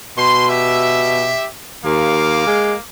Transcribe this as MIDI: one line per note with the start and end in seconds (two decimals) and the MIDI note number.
0.18 1.33 47
0.18 0.46 84
0.50 1.46 67
0.50 1.46 76
1.85 2.43 39
1.85 2.80 58
1.85 2.80 77
1.85 2.80 86
2.47 2.74 56